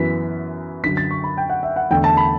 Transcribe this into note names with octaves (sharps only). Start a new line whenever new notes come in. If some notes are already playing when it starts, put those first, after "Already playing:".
Already playing: F#2 E3 B3 B6
F#2 D3 F#3 B6
A6
C#6
B5
G5
F#5
E5
F#5
E2 D3 A3 G5
A5
B5